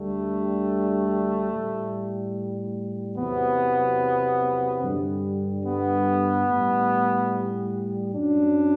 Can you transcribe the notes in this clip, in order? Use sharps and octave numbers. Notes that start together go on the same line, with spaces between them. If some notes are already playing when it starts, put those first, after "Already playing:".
Already playing: D2 D3 G3 A3
A2 G3
E2 C3 F#3 B3
G2 D3 G3
B3
A2 G3
F#2 F#3 D4